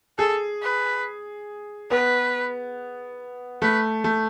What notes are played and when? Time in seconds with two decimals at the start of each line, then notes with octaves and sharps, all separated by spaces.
0.18 G#4 A4
0.62 B4
1.91 B3 B4
3.62 A3 B4
4.04 A3